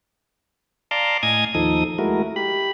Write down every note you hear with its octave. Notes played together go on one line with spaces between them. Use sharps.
D5 F5 A5 A#5 C6 D6
A2 D#5 G#5 D#6 G#6
D#2 F3 D#4 A4 D#6
G#3 A3 E4 F#4 A#4
G4 B5